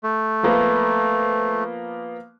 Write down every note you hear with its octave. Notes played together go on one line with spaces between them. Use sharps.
A3
F3 A#3 B3